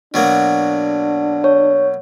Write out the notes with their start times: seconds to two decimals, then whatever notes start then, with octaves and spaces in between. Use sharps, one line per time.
0.14 B2 F#3 A#3 D4
1.44 C#5